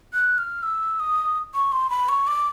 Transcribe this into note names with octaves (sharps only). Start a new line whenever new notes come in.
F#6
F6
E6
D#6
C#6
C6
B5
C#6
D6